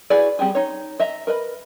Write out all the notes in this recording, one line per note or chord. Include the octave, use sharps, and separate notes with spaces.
E4 F#4 G#4 B4 D5
G3 C4 G4 G#4
D#4 C#5
D#5 E5 A#5
A#4 B4 D#5 B5